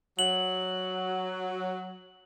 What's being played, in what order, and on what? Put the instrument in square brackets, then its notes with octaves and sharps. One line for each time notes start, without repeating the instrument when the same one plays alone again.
[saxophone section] F#3 [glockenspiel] F#7